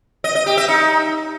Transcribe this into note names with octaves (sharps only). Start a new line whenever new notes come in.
D#5
D#5
G4
E5
D#4